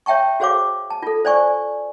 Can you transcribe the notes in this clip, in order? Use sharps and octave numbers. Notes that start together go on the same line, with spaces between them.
C#5 E5 G5 A5 C#6
F#4 G#4 C5 C#5 F5 D6
A5
F4 A4
C5 D5 G#5 C#6